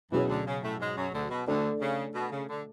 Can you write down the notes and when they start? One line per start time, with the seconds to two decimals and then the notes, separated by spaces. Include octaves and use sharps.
0.12 E2 B2 E3 F#3 C#4 G#4 C#5
0.28 D2 D3
0.46 C#3
0.63 A2 A3
0.80 G#2 G#3
0.96 F#2 F#3
1.13 D2 D3
1.30 B2
1.47 D2 D3 A3 D4 A4 D5
1.81 C#3
2.15 B2
2.32 C#3
2.49 D3